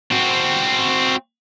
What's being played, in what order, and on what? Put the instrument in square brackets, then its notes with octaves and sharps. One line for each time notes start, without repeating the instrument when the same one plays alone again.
[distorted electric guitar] C4 F#4